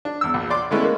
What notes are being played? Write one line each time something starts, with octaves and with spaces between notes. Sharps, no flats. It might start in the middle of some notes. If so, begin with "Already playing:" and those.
D4
E2 E6
A#1
D5 C6 D6
G#3 A3 B3 C#4 E4
G#3 A#3